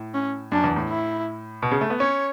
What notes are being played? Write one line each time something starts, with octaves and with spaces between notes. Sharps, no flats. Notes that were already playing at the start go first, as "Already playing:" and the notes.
Already playing: A2
C#4
F#2 D4
E2
A2
E4
B2
C#3
A3
B3
C#4 C#5